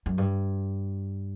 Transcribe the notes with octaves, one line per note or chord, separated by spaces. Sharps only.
F#2
G2